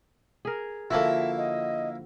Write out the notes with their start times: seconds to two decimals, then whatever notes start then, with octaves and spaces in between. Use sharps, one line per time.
0.45 G#4 A#4
0.91 D3 F3 A#3 E4 F#4 E5
1.37 D#5